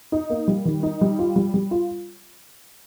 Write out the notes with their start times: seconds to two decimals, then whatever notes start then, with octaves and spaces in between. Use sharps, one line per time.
0.12 D#4
0.30 A#3
0.48 G3
0.65 D#3
0.83 D#4
1.01 G3
1.19 F4
1.36 G3
1.54 G3
1.71 F4